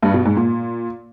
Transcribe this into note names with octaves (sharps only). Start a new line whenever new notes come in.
G2
B2
G#2
A#2